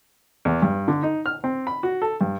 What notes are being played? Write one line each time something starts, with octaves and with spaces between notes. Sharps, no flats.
E2
G2
D3
D#4
F6
C4
B5
F#4
A4
G2